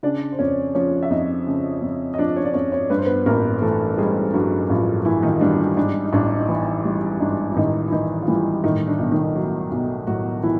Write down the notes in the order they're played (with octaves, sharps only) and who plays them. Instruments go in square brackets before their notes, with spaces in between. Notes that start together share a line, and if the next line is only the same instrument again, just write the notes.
[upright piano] C#3 D4 D5
C5
F2 C#4 C#5
F3 C#4 C#5
E5
F2 D#4 D#5
C#3
F2
D#5
F3 D4 D5
C#4 C#5
D5
F2 C#4 C#5
C#4 C#5
G2 B4
C5
B3 B4
A1 A#3 A#4
E3 A3 A4
G3 G#3 G#4
G2 F#3 F#4
A1 F3 F4
E3 E4
D#3 D#4
G3 D4
G#2 D4
D#4
A1 D4
D#4
E3 E4
G3
G#2 D4
E4
A1 D#3 D#4
E4
D#3 E3 D#4
F4
E3 G3 E4
A2 D#3 D#4
D4
B1
D#3 D#4
F#3
B1
A2 F#3 F#4
E3 E4